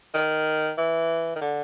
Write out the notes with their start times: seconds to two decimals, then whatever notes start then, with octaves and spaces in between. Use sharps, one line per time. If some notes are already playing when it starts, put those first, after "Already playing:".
0.14 D#3
0.78 E3
1.36 D#3
1.41 D3